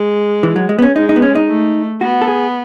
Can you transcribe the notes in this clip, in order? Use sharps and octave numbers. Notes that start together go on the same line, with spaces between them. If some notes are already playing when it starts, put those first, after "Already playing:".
Already playing: G#3
E3
F#3
G#3
B3
C#4
G#3 D#4
D#4
B3
C#4
D#4
A3
B3 F#4
A4
G#4